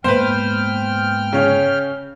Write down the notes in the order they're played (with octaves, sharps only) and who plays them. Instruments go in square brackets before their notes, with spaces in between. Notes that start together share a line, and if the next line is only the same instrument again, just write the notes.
[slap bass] G#2 A#3 B3 [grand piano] B4 C5 [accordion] G5 F6
[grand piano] C#3 C#4